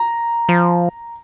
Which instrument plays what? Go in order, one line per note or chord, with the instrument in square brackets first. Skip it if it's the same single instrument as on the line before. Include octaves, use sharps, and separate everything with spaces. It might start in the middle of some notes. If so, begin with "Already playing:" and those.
Already playing: [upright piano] A#5
[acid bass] F3